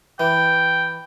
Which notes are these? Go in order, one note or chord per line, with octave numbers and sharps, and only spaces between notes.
E3 G5